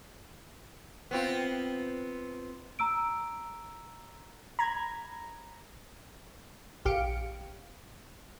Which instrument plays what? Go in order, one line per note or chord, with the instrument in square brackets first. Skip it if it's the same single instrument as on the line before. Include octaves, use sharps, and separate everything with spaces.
[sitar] B3 C4 F4
[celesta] A#5 E6 D7
[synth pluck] A#5 B5 G#6
[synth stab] A#1 G4 F5 C#7 D7